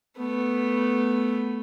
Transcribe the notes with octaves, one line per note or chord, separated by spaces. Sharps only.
A3 B3